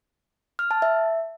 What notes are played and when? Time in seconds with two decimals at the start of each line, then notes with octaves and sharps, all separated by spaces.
0.59 F6
0.71 A5
0.82 E5